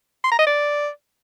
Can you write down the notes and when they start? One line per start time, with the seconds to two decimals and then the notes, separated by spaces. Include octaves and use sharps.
0.24 C6
0.31 A#5
0.39 D#5
0.46 D5